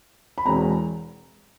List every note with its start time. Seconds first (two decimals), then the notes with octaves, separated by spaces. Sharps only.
0.38 B5
0.45 E1 E2 B2 G#3 C4 A#5